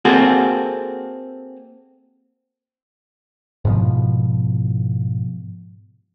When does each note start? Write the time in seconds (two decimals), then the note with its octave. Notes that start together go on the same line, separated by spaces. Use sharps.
0.05 A#3 C4 F#4 G#4 A4
3.65 G#2 B2 F3